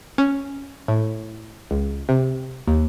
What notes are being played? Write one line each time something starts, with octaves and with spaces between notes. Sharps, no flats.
C#4
A2
C#2
C3
D#2